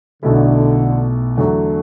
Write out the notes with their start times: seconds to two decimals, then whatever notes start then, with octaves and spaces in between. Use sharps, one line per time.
0.23 B1 B2 D3 A3 E4 A4
1.37 E2 D3 F#3 A3